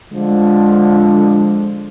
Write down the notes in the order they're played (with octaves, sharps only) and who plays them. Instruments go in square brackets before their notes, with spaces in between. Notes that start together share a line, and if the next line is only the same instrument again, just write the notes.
[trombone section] D3 F3 [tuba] G#3